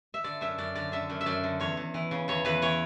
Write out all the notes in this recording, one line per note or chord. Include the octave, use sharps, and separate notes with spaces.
E5
D3 D5
F#2 E5
F#2 D5
D3 D5
D3 E5
F#2
E5
F#2 D5
D3
E2 C#5
E2
E3
C#3
E2 C#5
E2 B4
E3 C#5